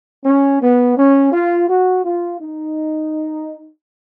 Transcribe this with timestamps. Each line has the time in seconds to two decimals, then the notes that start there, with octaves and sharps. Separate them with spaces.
0.25 C#4
0.61 B3
0.97 C#4
1.32 F4
1.68 F#4
2.04 F4
2.39 D#4